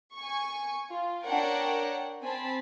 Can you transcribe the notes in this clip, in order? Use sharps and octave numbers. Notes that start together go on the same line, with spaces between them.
G#5 C#6
F4
D4 A#4 C#5 F#5 G5
C4 G#5 A5 B5